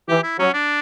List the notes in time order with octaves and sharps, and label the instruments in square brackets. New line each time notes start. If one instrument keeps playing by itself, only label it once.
[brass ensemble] E3 [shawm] G4
[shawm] E4
[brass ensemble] F#3 [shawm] C#4
[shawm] D4